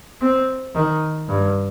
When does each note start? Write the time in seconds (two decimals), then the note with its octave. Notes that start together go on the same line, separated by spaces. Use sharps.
0.21 C4
0.75 D#3
1.29 G2